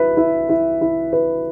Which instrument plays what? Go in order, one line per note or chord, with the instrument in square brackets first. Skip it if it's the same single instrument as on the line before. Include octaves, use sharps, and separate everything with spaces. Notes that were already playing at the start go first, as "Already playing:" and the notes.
Already playing: [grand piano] E4 B4
E4
E4
E4
B4